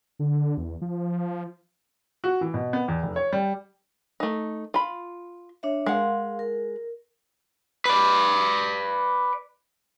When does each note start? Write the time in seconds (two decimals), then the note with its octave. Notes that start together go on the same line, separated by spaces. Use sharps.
0.19 D3
0.57 E2
0.82 F3
2.24 F#4
2.41 E3
2.54 B2
2.73 B3
2.88 E2
3.03 F1
3.16 C#5
3.32 G3
4.20 A3 D#4
4.74 F4 B5
5.63 D4 C#5 E5
5.86 G#3 A#4 F5 F#5 C6
6.39 A#4
7.85 B4 D5